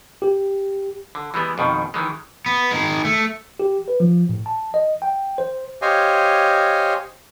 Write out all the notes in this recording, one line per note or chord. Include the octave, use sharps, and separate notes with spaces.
G4
D3
E3 G3 G#3 B3
F2 B2 D#3
D#3 E3 G#3
B3
D#3 G#3
A3
G4
B4
F3
A2
A5
D#5
G5
C5
G4 C5 C#5 D#5 F5 G#5